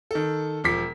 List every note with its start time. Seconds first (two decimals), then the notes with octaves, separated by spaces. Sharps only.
0.11 D#3 A4
0.64 E1 F3 D6 B6